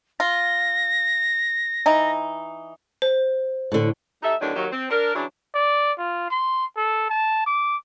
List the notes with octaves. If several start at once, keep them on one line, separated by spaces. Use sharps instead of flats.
F4 A#6
E3 D#4
C5
A2 D3
G3 D#4 A4 E5
E2 A2 D3 D#3 F#3 D4
D#2 D#3 F#3
C4
D4 A#4
C#3 E3 F#3 D4
D5
F4
C6
A4
A5
D6